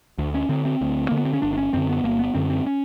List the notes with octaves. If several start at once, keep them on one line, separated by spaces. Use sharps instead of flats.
D2
C#4
D3 C4
C4
D2
D3 A#3
B3
C4
C#4
G1 D4
D4
C#4
F#2 D3 C4
B3
G1 A#3
B3
F#2 D3 C4
C4
C#4